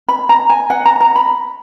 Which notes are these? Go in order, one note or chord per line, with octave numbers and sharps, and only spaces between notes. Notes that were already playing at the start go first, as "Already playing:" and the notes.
B5
A#5
G#5
F#5
A#5
A#5
B5